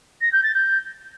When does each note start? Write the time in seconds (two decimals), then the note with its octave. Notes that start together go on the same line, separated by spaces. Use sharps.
0.21 A#6
0.32 G6
0.43 A6
0.55 G6